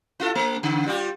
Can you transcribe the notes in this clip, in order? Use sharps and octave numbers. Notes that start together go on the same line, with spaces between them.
E4 F4 A4
A3
C#3
G3 F4 G4